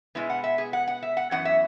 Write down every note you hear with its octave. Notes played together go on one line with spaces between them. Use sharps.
B2 G#3 B3 E4
F#5
E5
G#4
F#5
F#5
E5
F#5
F#2 E3 B3 F#5
E5